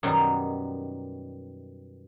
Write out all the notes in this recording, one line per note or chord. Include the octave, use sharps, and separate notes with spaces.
F#2 B2 D#3 G3 D#4